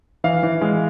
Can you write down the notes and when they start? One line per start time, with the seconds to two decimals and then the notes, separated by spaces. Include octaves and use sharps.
0.24 E3 F5
0.43 E3
0.61 G#3